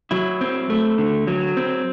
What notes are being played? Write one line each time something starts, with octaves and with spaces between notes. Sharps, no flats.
F#3 E4
C4
A3
D3
F#3
C4